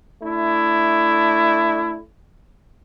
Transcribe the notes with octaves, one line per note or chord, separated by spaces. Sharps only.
A3 D4 E4